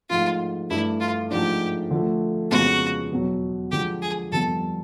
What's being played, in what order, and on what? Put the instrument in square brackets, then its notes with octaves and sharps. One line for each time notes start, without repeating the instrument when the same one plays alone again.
[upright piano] G#2 F3 A3 [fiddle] F4
[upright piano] G2 E3 A3 D4 [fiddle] E4
[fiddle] F4
[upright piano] G#2 F3 A3 D4 [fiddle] G4
[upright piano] D3 F3 A3
[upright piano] F2 C#3 F3 G#3 B3 [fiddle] F#4
[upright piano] E2 B2 F#3
[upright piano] D3 F3 G#3 [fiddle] G4
[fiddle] G#4
[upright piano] F2 D3 G3 B3 [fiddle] A4